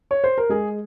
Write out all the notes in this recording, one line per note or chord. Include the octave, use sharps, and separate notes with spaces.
C#5
C5
A#4
G#3 G#4